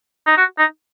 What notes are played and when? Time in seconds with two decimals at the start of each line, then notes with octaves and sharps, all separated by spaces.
0.27 D#4
0.38 F#4
0.59 D#4